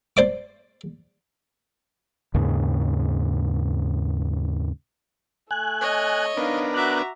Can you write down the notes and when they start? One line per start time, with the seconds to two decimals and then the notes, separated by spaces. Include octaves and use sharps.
0.17 C5 D5 D6
2.34 D#2 G#2 C#3
5.51 A3 G#5 F#6
5.81 C#5 D#5
6.37 B3 D4 D#4 A#4 F5
6.74 F#4 E5 A#5 D6 F#6